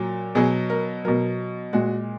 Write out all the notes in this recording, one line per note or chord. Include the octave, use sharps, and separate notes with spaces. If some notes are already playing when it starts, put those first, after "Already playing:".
Already playing: A#2 F#3
B2 F#3 G#4
A#4
B2 F#3 A#4
A#2 G#3 F#4